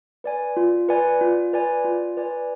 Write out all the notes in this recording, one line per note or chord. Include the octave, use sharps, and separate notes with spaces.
B4 D5 G#5
F4
B4 D5 G#5
F4
B4 D5 G#5
F4
B4 D5 G#5